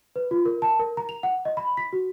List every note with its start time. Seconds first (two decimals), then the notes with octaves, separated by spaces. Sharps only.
0.16 B4
0.31 F4
0.45 A#4
0.62 A5
0.79 A#4
0.97 A#5
1.09 F7
1.23 F#5
1.45 D#5
1.57 B5
1.77 B6
1.93 F#4